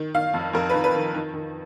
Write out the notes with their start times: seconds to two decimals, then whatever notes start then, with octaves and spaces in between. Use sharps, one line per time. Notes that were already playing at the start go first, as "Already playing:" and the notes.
Already playing: D#3
0.14 D#3 F5
0.34 F2
0.53 F2 A#4
0.69 D#3 B4
0.84 B4
0.95 D#3
1.14 D#3
1.33 D#3